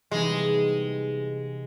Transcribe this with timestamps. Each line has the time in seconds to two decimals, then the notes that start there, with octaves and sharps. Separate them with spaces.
0.11 C3 E3 G3 G#3 B3 D#4